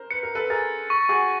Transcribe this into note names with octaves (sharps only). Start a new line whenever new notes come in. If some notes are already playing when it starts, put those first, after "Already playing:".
Already playing: A#4 C5
B4 C#7
A#4
A4 B4
G#4 A#4 A6
C#6
F#4 G#4